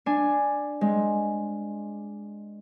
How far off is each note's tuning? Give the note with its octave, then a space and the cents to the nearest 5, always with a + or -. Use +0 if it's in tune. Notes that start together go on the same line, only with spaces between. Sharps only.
D4 +5 G#5 +0
G#3 +0 C4 +0